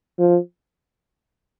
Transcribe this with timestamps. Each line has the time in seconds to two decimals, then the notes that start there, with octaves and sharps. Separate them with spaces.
0.19 F3